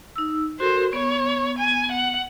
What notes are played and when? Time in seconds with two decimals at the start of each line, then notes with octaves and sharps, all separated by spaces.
0.16 D#4 E6
0.60 F#4 A4 A#4 C5
0.93 B3 C#5
1.59 G#5
1.92 F#5